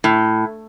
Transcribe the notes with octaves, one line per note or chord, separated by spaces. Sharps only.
A2